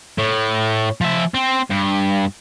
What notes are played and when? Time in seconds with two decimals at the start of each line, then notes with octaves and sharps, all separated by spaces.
0.18 A2
1.01 F3 E5
1.34 C4
1.70 G2